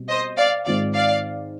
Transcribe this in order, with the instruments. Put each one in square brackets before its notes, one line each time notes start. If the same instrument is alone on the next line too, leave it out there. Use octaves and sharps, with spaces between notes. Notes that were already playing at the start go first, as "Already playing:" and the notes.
Already playing: [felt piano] B2 G3 C4
[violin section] C5 D#5
D5 F5
[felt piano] G#2 D#3 G#3 C4 F4 [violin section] D5 F5
[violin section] D5 F5